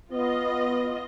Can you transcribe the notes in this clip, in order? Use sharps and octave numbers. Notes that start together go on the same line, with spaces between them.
B3 F4 D#5